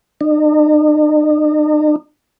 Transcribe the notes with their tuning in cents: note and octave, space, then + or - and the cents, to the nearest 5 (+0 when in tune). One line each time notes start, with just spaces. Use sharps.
D#4 -45